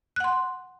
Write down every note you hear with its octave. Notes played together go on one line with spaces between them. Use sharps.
F#5 C6 F#6